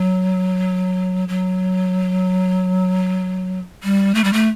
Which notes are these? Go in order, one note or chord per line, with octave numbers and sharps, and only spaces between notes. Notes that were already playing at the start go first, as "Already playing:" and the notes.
Already playing: F#3
F#3
G3
A3
G3
A3